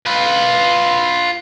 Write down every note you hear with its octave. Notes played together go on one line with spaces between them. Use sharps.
F4 B4